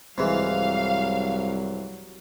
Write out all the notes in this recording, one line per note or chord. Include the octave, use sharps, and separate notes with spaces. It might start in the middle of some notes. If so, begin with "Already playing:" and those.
C2 G#2 E3 F#3 F5